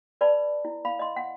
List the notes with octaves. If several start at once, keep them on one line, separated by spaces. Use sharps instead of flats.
B4 D5 A5 B5
E4
F5 B5
D#5 C6
F#5